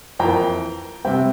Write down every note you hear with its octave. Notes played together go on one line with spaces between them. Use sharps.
F2 E3 A#3 G5 A#5
C3 G3 C4 E5 G5